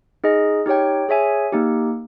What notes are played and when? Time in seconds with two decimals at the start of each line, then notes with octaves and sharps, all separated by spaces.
0.24 D#4 G#4 D#5
0.66 D#4 G4 C#5 G5
1.09 G#4 C#5 E5 G#5
1.52 A#3 D#4 G4